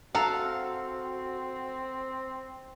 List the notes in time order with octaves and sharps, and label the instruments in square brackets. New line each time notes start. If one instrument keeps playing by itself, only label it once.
[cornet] C4 [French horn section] F#4 [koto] A4 F5 [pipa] F#5 A#5